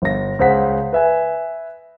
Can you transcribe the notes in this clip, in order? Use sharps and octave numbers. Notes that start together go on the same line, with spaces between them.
G1 A#6
C#2 G#4 C5 F#5 B6
B4 E5 G#5